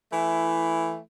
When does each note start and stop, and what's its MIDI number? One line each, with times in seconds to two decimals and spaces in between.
0.13 0.98 52
0.13 0.98 57
0.13 0.98 64